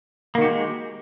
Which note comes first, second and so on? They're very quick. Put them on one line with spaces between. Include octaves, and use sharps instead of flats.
A#3 D#3 F#4 G4 G#3